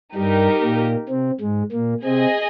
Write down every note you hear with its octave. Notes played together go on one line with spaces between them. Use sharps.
G2 G3 D#4 G4 A#4
A#2 A#3
C3 C4
G#2 G#3
A#2 A#3
C3 C4 G#4 D#5 G#5